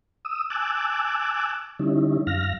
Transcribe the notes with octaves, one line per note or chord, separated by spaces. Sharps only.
D#6 E6
G#5 A5 D6 E6 F#6
D3 G3 C#4 D#4 E4
F#2 F5 F6 A#6